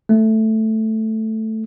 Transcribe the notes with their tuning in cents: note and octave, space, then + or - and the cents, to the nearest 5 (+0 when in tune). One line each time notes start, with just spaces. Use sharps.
A3 +0